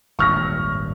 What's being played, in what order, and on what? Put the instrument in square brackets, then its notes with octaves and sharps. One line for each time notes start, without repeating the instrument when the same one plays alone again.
[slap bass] D#1 G#1 G2 [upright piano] C#6 F6 A#6